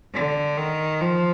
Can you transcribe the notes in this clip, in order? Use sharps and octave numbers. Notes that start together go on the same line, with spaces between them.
D3
D#3
F3